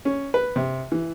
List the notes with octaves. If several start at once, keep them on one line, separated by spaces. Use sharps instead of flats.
C#4
B4
C3
E3